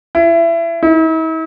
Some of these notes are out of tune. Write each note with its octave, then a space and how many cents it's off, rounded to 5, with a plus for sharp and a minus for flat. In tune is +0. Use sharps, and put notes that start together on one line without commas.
E4 +25
E4 -45